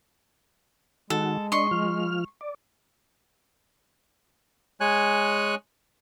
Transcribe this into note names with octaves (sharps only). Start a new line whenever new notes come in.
D#3 G#3 F#4 A4
D4 D#5 C6 C#6
F3 F6
D5
G#3 C#5 G#5 F#6